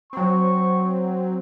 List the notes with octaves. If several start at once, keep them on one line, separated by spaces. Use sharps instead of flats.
F#3 C4 C#6